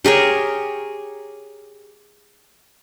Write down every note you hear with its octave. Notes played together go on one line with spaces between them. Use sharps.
G4 G#4 A#4 C#5